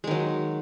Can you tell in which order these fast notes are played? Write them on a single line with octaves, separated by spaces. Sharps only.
G#3 D#3 F#3